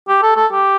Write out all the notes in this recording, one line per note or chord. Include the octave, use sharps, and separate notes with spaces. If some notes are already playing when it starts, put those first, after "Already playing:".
G4
A4
A4
G4